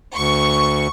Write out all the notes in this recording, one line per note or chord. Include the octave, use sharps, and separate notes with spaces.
D2 C#6